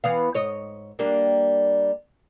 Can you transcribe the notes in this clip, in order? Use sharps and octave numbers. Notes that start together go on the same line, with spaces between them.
E3 B3 F5
G#2 C#5 D#5
G3 A#3 D4